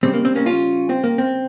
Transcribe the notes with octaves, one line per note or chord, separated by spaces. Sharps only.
C#3 G3 C4
A#3
C4
A#3 C#4
C#4 F4
C4
A#3
C4